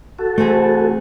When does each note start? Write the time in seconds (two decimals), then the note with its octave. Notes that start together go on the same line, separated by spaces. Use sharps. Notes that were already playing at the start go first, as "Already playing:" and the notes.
0.19 F#4 A4
0.38 C3 E3 A3 C4 G#4